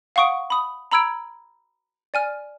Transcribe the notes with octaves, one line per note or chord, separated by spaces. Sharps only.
F5 F#5 C#6 D#6 D7
B5 D#6
A#5 B5 E6 G#6 D7
D5 G#5 F6